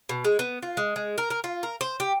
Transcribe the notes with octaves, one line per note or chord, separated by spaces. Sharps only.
B2
G#3
B3
F4
G#3
G#3
A#4
A#4
F4
A#4
C5
G4